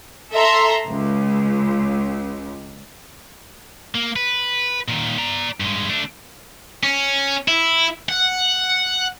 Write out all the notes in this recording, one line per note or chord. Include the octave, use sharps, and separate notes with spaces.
A4 E5 A#5 C6
C#2
A#3
B4
A#2 D#3
D5 A#5
G2 G#3
A3 D4
C#4
E4
F#5